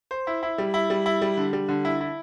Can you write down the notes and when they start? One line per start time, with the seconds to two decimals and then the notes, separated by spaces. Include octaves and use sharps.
0.11 C5
0.27 E4
0.43 E4
0.58 G3
0.74 E4
0.90 G3
1.06 E4
1.21 G3
1.37 D3
1.53 G3
1.68 D3
1.85 E4
2.01 E4